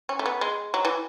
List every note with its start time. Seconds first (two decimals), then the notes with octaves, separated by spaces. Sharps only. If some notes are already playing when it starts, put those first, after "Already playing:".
0.09 C#4
0.19 A3
0.26 B3
0.41 G#3
0.74 F#3
0.85 E3